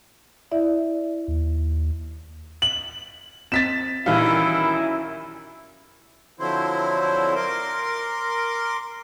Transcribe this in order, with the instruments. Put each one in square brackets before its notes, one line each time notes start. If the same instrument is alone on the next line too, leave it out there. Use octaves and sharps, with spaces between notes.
[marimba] E4 D5 E5
[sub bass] D#2
[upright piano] F#7
[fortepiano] C4 [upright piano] A6 B6 E7
[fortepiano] A#1 G3 F5 [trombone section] F#2 E4 [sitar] D#3 E3
[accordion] D3 F3 F#3 C4 E4 C5
A#4 C6 D6